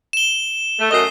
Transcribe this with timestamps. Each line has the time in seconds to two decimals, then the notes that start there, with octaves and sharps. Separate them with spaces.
0.13 E7 G7
0.80 A3
0.91 F#2 A3 D#5 D#6 C7